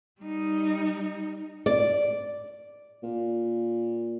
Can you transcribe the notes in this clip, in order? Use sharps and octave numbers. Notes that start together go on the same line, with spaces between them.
G3 D#4
D5
A#2